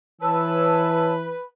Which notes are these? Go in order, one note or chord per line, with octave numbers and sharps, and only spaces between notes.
E3 B4 C#5 A5 E6